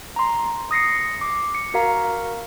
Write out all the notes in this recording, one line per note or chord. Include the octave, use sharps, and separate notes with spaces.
A#5 C6
D#6 A#6 C7 C#7
D6
C#7
F#4 A#4 F5 A#5